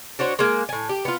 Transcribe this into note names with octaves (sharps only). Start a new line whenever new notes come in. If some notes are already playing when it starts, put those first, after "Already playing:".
D4 F#4 C5 C#5
G#3 A#3
A2 G#5
G4
B3 F4